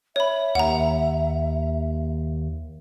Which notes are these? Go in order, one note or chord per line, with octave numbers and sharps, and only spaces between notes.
C#5 E5 B5
D#2 F#5 A#5